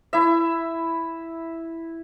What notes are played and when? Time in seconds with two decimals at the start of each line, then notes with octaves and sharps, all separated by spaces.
0.13 E4 E5